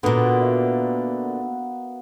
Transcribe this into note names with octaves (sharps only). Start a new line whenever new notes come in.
A#2 D3 B3 F#4 A#4
E5 F5 C#6